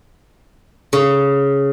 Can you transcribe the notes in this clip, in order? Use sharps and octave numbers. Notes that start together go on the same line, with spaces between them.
C#3